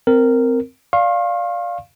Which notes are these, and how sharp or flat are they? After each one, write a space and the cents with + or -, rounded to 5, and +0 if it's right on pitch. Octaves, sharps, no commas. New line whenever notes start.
C4 -15 A#4 -10
D5 +0 F5 +0 C#6 -45